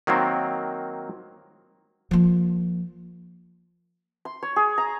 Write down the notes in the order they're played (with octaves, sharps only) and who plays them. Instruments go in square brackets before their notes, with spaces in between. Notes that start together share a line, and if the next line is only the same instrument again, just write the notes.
[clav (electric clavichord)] D#3 F#3 A#3 C4
[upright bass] F3 A#3
[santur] C6
C#5
G#4
A#5